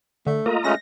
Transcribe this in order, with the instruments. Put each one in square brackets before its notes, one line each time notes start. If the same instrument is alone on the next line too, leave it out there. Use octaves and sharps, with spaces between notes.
[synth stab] D3 [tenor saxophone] A3
[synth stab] A#3 [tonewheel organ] F4 D#5 A#5
[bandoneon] G#3 A3 C#4 [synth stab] A#6